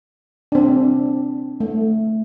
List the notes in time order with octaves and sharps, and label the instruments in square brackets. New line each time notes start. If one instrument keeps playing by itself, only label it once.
[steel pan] D4
C4
A3